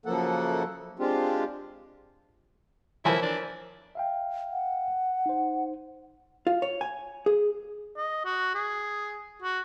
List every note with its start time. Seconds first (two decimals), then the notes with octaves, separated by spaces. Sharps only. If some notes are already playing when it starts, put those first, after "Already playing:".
0.06 F#2 C#3 F3 A#3 A4 F#5
0.99 G#3 C4 D4 F4 G4
3.05 E3 F3 E4 A#4 C#5 G#5
3.22 D4
3.95 E5 F5 G5
4.53 F#5
5.26 D#4 C5
6.47 F4
6.62 C#5
6.81 G#5
7.26 G#4
7.97 D#5
8.25 F#4
8.55 G#4
9.42 F#4